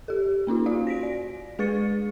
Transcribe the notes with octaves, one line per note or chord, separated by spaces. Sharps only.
G4 A4
A#3 C#4 D#4 F4
F#4 D5 F5
A#6 B6 D7
D5
G#3 G#4 B4 C#6 A6 C#7